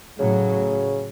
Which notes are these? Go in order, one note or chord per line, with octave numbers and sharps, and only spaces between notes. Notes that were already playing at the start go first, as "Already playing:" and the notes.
A2 C#3 F#3